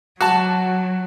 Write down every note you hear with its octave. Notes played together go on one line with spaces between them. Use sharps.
F#3 F#4 A5